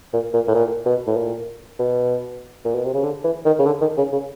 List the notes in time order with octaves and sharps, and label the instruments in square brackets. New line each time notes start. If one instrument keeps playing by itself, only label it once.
[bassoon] A#2
A#2
A2
A#2
B2
A2
A#2
B2
A#2
B2
C3
C#3
D3
E3
D#3
C#3
D3
D#3
C#3
C#3